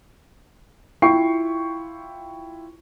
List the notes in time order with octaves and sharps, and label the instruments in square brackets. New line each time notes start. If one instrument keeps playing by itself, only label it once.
[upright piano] E4 F4 G5 C#6 C7